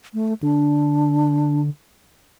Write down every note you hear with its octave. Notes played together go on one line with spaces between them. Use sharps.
A3
D3 D4